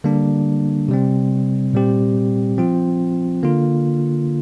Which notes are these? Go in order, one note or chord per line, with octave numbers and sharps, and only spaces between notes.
D3 G3 A#3 D4
C3 G3 C4
A#2 G3 C4 G4
F3 C4 F4
D3 A#3 F4